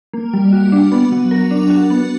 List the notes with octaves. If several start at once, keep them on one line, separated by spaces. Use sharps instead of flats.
A#3
G3
F#4
D4
B3
F#3
A#4
D4
F#4
B3